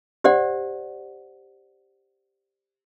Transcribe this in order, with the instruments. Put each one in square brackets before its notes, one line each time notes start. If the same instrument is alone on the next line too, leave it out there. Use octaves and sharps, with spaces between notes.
[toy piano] G4 C5 D5 F#5